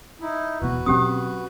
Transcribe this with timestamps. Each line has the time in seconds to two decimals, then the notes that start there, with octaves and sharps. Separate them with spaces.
0.21 D#4 E4
0.62 E1 B2 B3 F#4 B4
0.86 B2 F#3 C4 C#4 G4 D#6